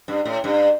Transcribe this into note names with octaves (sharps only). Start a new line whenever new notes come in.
G2
A2
G2